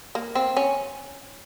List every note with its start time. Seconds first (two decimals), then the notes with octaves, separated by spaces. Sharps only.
0.15 A#3
0.35 C4
0.57 C#4